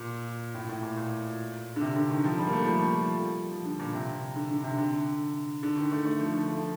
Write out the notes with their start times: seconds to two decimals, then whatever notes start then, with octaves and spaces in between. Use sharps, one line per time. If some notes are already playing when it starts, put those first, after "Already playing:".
Already playing: A#2
0.55 A2
0.69 A2
0.83 A#2
0.97 A#2
1.76 D3
1.81 C3
1.96 D3
2.10 D#3
2.24 F3
2.38 G3
2.47 A#3
2.52 A3
2.62 F3
2.67 G3
3.51 F3
3.65 D3
3.79 A#2
3.94 C3
4.36 D3
4.50 D3
4.64 C3
4.78 D3
5.63 D3
5.77 D#3
5.91 A3
6.06 A3
6.20 F3
6.34 D3
6.48 F3